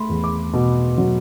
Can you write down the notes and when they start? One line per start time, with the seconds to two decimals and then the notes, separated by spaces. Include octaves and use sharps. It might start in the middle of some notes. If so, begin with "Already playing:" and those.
Already playing: A3 B5 C6
0.09 E2
0.24 D6
0.53 B2
0.98 F#3